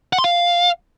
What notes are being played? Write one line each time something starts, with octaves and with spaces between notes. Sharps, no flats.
F#5
C6
F5